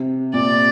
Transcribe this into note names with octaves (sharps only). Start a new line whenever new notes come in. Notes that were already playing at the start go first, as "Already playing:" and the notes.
Already playing: C3
A#2 D5